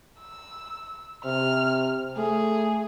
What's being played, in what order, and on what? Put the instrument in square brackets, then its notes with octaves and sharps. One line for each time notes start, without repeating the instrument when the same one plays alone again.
[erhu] E6
[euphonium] C3 [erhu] F6
[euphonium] A3 [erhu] G#4